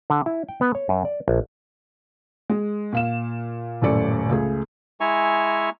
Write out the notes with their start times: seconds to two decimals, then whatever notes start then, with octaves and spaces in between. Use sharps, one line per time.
0.10 D3
0.26 E4
0.49 G5
0.61 B3
0.75 C#5
0.89 F#2
1.05 D5
1.28 A#1
2.50 G#3
2.93 A#2 F5 E7
3.82 D#1 F#2 A2 A4 D5 C#7
4.29 C#2 A3 G#4
5.01 G#3 E4 E5 G#5 A#5 C#6